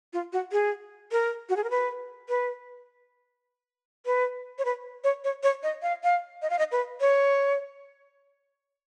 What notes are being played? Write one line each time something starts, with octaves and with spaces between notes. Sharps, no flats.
F4
F#4
G#4
A#4
F#4
G#4
A#4
B4
B4
B4
C#5
B4
C#5
C#5
C#5
D#5
F5
F5
D#5
F5
D#5
B4
C#5